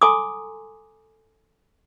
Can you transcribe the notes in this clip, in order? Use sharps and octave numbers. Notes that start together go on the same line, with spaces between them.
A4 G#5 A#5 C6 D6 D#6